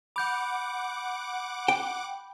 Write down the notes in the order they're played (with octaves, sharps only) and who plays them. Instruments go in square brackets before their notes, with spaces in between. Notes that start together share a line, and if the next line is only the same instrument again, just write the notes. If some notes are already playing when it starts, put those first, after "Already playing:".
[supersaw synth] F#5 D6 [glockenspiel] B5 G6
[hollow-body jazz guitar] G5